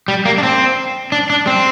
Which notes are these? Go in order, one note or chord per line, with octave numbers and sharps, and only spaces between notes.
G3
A#3
D4
C4
D4
D4
C4